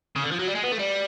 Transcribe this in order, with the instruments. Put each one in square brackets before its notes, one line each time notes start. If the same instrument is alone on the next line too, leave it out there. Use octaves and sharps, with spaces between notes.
[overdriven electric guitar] C#3
D3
F3
F#3
G3
G#3
B3
A3
G3